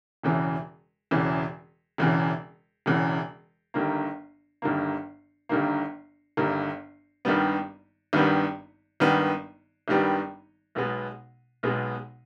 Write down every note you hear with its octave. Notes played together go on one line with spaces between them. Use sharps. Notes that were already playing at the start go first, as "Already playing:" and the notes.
E1 E2 C#3 E3
E1 E2 C#3 E3
E1 E2 C#3 E3
E1 E2 C#3 E3
G1 G2 D#3 A#3
G1 G2 D#3 A#3
G1 G2 D#3 A#3
G1 G2 D#3 A#3
G#1 G2 D#3 G3 B3
G#1 G2 D#3 G3 B3
G#1 G2 D#3 G3 B3
G#1 G2 D#3 G3 B3
B1 B2 G#3 B3
B1 B2 G#3 B3